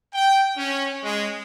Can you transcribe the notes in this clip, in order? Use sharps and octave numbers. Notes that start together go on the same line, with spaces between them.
G5
C#4
G#3